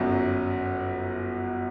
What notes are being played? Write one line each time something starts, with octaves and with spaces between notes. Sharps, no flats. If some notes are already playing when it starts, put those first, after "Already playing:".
Already playing: G1 F#2 F#3